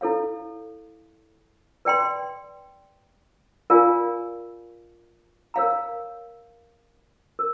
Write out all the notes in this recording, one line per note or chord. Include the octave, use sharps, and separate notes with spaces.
E4 A4 C#5 F5
B4 D5 G5 C6
F4 A#4 D5 F5 G#5
A#4 C#5 F5 A#5
A#4